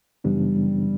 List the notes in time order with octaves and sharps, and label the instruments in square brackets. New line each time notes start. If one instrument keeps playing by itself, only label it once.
[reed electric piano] F#2 C#3 E3 B3 D4 [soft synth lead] G3